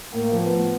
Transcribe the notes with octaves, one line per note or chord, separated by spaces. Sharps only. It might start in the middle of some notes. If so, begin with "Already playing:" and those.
A2 A#3
F3
B3
A2